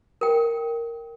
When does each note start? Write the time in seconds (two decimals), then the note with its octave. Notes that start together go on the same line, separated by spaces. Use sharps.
0.21 A#4 G5